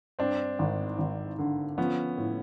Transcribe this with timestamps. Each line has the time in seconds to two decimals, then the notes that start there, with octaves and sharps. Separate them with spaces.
0.19 G2 C4 D4
0.59 G#1
0.98 G#1
1.39 D3
1.78 F3 B3 C#4
2.17 A2